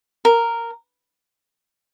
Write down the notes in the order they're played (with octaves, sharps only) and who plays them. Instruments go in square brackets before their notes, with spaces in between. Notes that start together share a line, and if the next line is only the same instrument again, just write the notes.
[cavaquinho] A#4